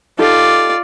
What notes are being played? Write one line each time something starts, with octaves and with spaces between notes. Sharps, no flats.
D#4 F4 G4 A4 D5